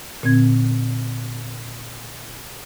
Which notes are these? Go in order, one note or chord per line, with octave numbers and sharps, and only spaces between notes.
A#2 D3 C4 G#6